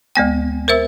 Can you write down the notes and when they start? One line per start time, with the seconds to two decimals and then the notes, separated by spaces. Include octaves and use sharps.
0.15 D2 G#3 B3 G5
0.68 A#4 C5 E5 E6